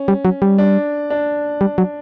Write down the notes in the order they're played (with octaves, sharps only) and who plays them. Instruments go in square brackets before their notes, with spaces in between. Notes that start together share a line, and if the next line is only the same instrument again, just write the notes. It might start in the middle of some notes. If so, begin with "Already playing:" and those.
Already playing: [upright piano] C#4
[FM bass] G3
F#3
G3
[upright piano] D4
D4
[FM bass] G3
F#3